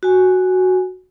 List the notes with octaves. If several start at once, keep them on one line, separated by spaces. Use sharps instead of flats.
F#4 G#5